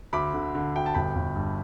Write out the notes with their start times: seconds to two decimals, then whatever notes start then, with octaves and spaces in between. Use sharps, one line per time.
0.13 D2 B5 D6
0.34 D3
0.55 D3
0.75 D2 G5
0.86 A5
0.94 G1 G5 B5
1.16 G1
1.36 G2